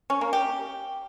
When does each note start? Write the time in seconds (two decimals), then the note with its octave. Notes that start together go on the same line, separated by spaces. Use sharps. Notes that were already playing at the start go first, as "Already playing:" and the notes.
0.10 C#4
0.21 A#3
0.33 G4